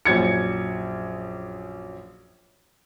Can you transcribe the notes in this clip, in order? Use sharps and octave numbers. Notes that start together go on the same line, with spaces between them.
A#1 F#2 G#6 C#7